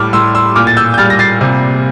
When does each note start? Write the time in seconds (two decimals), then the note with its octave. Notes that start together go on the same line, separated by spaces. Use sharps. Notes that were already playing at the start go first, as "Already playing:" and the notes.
Already playing: A2 G3 D6 F6
0.13 A2 C6 E6
0.35 C6 E6
0.56 A#2 D6 F6
0.67 A6
0.77 E6 G6
0.94 G6
0.98 G3 F6 A6
1.10 A#6
1.19 A6 C7
1.41 C3